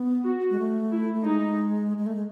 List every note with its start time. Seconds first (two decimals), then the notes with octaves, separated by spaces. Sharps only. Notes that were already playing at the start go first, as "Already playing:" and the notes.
Already playing: B3
0.26 F#4
0.50 G#3
0.59 A3
0.92 E4
1.14 A3
1.24 G#3 D#4
1.98 G#3
2.06 A3
2.14 G#3